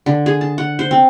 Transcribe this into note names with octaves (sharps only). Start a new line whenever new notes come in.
D3
G#4
A5
F#5
C5
C4